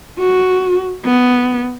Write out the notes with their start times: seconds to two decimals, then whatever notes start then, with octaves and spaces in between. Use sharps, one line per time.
0.19 F#4
1.05 B3